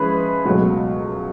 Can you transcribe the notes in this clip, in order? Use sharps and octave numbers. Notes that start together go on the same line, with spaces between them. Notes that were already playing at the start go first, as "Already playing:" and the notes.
Already playing: F3 G#3 C#4 E4 G#4 B4
C#2 B2 F#3 A3